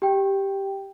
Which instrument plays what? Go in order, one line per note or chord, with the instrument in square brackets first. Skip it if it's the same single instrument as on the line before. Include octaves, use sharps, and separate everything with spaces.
[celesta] G4 G5